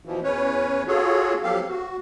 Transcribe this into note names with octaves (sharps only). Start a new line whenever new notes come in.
B2 E3 F3
E2 C#4 B4 C#5
F4 F#4 G#4 A4 C#5
F3 F#3 B3 G4 A4 F5
F#4